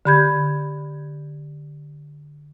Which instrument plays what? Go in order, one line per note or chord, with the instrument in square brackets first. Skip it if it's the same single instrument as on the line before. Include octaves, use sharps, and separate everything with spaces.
[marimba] D3 G4 B5 G6 G#6